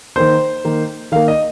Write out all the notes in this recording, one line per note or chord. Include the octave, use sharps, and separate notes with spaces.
D#3 A#3 C5
D#3 A#3
D#3 A#3 F5
D#5